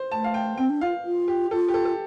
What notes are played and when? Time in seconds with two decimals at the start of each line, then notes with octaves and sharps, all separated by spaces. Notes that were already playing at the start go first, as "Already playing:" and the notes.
Already playing: C5
0.12 A3 A5
0.24 F5
0.34 G5
0.58 C4 G5
0.69 D4
0.81 F4 F5
1.05 F4
1.28 G4
1.51 F4 A4
1.68 G4
1.74 A4
1.85 A4